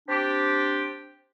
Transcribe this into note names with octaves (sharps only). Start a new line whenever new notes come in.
C4 D4 G4